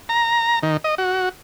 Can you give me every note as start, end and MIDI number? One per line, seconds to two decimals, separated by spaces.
0.09 0.59 82
0.63 0.77 51
0.84 0.95 75
0.98 1.29 66